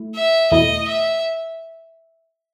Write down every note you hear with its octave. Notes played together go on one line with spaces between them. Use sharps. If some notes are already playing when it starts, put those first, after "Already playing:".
Already playing: A3 E4
E5
E2 B2 A3 E4 D#5
E5